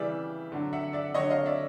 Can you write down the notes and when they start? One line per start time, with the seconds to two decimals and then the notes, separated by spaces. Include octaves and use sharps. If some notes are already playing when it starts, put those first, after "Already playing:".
Already playing: C#3 E3 G3 D5 E5
0.52 D3 F#3
0.73 E5 F#5
0.93 D5 E5
1.14 D3 F#3 C#5 D#5
1.30 D#5 F5
1.46 D5 E5